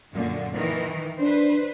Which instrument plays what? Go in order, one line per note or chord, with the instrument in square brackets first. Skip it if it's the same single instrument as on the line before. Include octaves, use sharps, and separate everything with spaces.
[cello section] F#2 A#2 D3
D#3 E3
[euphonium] D4 [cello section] B4 C5